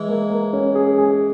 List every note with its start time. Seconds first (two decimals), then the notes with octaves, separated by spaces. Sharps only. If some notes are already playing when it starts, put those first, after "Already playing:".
Already playing: E3 G#3
0.08 A#3
0.30 A#3
0.53 C#4
0.75 G#4
0.98 G#4